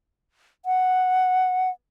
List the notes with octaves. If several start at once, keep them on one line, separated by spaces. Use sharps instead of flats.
F#5